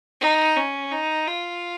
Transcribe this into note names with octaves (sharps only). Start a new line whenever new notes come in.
D#4
C#4
D#4
F4